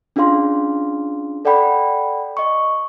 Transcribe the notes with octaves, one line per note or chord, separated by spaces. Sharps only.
C#4 D4 F4 G#4 F5 C6
A4 D5 F#5 G5 B5
D#5 C#6